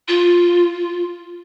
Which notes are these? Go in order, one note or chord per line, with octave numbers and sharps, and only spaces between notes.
F4